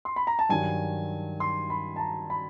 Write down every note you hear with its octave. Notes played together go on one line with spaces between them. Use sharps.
C6
B5
A#5
A5
G2 D#3 F#3 G#5
C6
B5
A5
A#5
B5